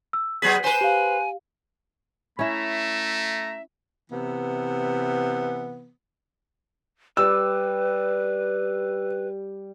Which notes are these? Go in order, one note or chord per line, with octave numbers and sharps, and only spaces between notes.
E6
F#3 B3 G#4 B6
B4 C5 G#5
G4 F5
A3 C#4 E4 E5 A#5
C3 E3 B3
G3 B4 E6